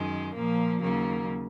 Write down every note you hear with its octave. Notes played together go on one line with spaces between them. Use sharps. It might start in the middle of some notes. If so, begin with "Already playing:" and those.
Already playing: F#2 D#3 G#3
A#2 F3 A#3
D#2 C#3 F#3 A#3